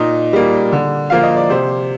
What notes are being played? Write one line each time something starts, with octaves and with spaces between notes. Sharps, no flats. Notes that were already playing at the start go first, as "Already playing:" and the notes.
Already playing: A#2 D#4 D#5
G3 A#3
D3
F3 A#3 F5
D#5
D5
C3 C5